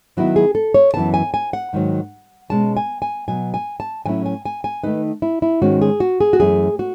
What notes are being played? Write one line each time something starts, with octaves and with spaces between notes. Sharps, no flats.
D#3 F#3 B3 E4 F#4
G#4
A4
C#5
F#2 E3 B3 A5
G#5
G#5
F#5
G#2 D#3 F#3
B2 G#3 C#4 A5
G#5
G#5
B2 F#3 B3 G#5
G#5
A5
A2 F#3 C#4 E4 G#5
G#5
G#5
G#5
D#3 A3 D#4 B4
E4
E4
G#2 D#3 G#3 C#4 F#4
G#4
F#4
G#4
F#4
F#2 E3 A3 G#4
F#4